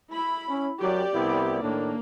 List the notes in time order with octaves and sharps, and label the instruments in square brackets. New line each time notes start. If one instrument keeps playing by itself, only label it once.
[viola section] E4 B5
[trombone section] C#4
[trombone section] F#2 [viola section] G4 D5
[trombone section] C2 B3 E4
[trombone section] A2 D#3 D4 [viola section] A#3